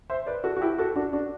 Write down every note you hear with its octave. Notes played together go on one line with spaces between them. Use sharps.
C5 E5
B4 D5
F#4 A4
F#4
E4 G4
F#4 A4
D4 F#4
D4 F#4